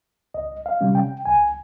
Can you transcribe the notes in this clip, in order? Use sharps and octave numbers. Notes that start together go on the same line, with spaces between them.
C#2 D#5
F5
C3 G3 C#4
G5
C#2 G#5